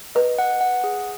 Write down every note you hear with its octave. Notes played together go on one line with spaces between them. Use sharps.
B4 D#5
F#5
F#5
G#4